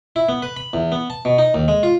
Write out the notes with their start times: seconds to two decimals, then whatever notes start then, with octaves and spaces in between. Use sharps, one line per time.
0.16 E4
0.29 B3
0.42 B4
0.57 B5
0.73 E2
0.92 B3
1.10 A5
1.25 B2
1.38 D#4
1.54 D#2
1.68 G#3
1.83 F4